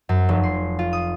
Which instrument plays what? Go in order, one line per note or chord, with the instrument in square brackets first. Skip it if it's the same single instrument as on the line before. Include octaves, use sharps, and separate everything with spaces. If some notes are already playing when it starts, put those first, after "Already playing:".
[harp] F#2
F1
C6
F4
D#6